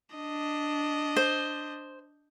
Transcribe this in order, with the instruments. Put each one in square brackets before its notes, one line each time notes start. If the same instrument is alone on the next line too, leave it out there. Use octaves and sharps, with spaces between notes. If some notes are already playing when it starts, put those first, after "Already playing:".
[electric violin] D4 D#5
[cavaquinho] C5